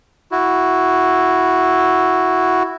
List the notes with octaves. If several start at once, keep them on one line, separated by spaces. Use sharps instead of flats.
E4 F#4